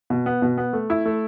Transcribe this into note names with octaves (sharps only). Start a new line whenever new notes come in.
B2
B3
B2
B3
A3
E4
A3